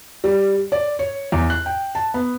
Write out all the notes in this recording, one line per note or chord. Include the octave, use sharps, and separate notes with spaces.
G3
D5
C#5
E2
F#6
G5
A5
B3